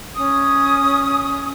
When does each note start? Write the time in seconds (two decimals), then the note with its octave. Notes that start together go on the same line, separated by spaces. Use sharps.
0.16 C#4 D#6